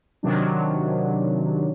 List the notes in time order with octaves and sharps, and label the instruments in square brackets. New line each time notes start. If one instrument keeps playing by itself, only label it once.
[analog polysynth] C3 D#3 F#3 D4